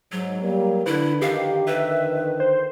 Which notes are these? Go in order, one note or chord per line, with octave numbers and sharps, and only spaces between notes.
G#2 F#3
G3 A#3
D3 E4 B4
F2 D3 D#3 G4 F5
B4 E5
C5